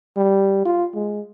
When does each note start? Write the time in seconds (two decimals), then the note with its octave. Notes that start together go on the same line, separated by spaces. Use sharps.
0.17 G3
0.66 F4
0.95 G#3